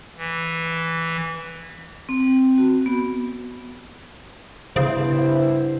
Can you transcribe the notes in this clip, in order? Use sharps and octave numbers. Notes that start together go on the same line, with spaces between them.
E3
C4
F#4
B3
G2 C#3 B3 E4 C5